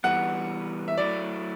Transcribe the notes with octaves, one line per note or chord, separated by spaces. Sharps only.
E3 G3 B3 F#5
E5
F#3 A3 E4 D5